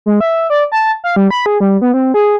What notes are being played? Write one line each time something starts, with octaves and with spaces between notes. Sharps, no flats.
G#3
E5
D5
A5
F5
G3
B5
G#4
G3
B3
C4
G#4